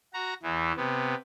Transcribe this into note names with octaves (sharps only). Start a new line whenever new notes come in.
F#4 A#5
E2 E3
C3 B3